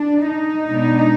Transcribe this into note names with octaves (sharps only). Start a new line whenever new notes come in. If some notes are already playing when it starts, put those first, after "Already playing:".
Already playing: D4
D#4
B2 G#3 B3 D4